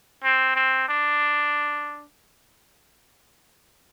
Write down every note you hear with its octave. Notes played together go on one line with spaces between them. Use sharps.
C4
C4
D4